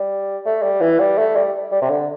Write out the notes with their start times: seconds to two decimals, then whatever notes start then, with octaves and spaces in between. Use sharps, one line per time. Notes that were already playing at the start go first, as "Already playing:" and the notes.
Already playing: G3
0.46 A3
0.63 G3
0.81 E3
0.99 G3
1.18 A3
1.36 G3
1.72 G3
1.82 C3
1.89 D3